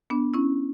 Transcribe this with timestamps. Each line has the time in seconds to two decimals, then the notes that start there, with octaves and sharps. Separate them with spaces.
0.10 B3 D4
0.34 C#4 E4